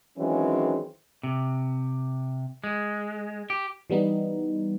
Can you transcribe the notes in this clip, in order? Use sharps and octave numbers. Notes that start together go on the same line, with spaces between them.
D#3 E3 F#3 G#3 C4 C#4
C3
G#3
G4
E3 G3 B3 D#4